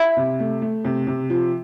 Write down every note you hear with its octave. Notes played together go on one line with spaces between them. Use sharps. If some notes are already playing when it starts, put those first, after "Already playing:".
Already playing: E4
C3
A3
A3
C3
C3
F3